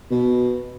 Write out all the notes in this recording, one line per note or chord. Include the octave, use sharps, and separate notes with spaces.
B2